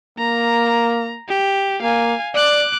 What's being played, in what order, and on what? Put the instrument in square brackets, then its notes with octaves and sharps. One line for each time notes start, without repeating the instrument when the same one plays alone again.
[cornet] A#3 [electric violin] A#5
[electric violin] G4
[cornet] A#3 [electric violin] F5 G#5
[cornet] D5 [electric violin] D6 F#6